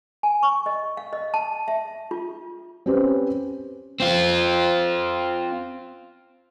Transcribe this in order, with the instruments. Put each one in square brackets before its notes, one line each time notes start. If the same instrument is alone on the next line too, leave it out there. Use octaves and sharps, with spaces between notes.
[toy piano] G#5
C#6
D#5
F5
D#5
A5
E5
F4
[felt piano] C4 C#4 G4 B4 C5
[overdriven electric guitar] C4 F4